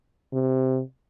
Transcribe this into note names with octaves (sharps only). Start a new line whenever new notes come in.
C3